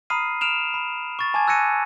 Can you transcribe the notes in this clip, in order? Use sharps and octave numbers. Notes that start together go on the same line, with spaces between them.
A#5 B5 D#6 F6 C7 D#7
F6 D7 E7 F7
B5
C#6 A6
G#5 A5 D6 G#6
E6 F#6 G#6 A#6 C#7 D#7